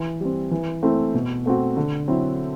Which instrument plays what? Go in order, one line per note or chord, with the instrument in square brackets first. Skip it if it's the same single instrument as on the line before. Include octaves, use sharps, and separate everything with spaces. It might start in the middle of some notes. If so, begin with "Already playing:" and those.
Already playing: [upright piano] E3
G3 C4
E3
A3 C4 E4
B2
A3 C4 F#4
D3
F#3 C4 E4